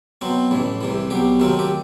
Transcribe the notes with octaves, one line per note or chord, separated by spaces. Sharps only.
B2 F#3 C4
A1 A2 E3
C2 C3 E3
B1 B2 F#3 G4
D#2 D#3 F#3 A3 C4
G4